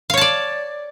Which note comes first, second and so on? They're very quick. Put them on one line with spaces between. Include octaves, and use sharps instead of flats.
F5 C#5 A5 D5